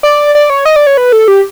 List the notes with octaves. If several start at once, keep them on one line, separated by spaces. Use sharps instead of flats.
D5
D5
C#5
D#5
D5
C#5
B4
A4
G4